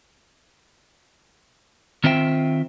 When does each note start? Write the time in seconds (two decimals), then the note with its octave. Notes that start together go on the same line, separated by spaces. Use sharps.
2.04 D#3 C4 F4 C5 E5 G5